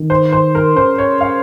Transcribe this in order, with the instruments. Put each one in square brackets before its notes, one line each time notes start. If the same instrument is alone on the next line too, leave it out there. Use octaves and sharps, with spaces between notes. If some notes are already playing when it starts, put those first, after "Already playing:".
Already playing: [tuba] D#3
[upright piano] C5
C5
A#4
[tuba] C#3 [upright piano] C5
[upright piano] C#5
F5